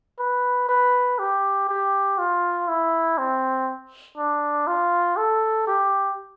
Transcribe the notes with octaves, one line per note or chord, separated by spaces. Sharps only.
B4
B4
G4
G4
F4
E4
C4
D4
F4
A4
G4